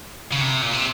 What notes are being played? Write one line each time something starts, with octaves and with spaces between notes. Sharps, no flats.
C#3
C3
A#2
C3